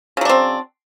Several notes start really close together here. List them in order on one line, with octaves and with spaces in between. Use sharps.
C#3 F#3 D4 C4